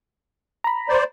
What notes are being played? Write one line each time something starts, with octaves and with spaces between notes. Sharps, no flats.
A#5 B5
C5 D5